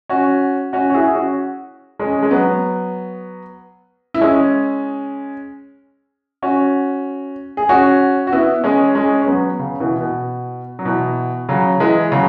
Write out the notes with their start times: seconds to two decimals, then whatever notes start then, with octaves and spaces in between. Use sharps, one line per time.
0.09 C#4 F#4
0.73 C#4 F#4
0.90 F#4
0.94 E4 G#4
1.15 C#4 F#4
1.99 G#3 C#4
2.23 G#3
2.31 F#3 B3
4.14 E4
4.21 G#3 C#4
6.42 C#4 F#4
7.57 G#4
7.69 C#4 F#4
8.27 F#4
8.32 B3 E4
8.64 G#3 C#4
8.95 G#3 C#4
9.22 C#4
9.27 F#3 B3
9.59 C#3
9.80 B2 E3
10.01 B2
10.79 F#3
10.85 B2 E3
11.49 C#3 F#3
11.80 E3 G#3
12.12 C#3 F#3